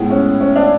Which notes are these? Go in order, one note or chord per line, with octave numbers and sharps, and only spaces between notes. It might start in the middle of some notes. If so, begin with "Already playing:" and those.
Already playing: A2 G#3 B3
C#4
C#4
D4